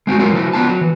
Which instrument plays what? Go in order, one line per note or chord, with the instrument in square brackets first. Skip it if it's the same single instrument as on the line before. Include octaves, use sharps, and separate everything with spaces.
[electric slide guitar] G#3 C4 F4 F#4
F#3 G#3 A#3 F4
F3 E4 F#4
B3 F4 A5
F#3
E3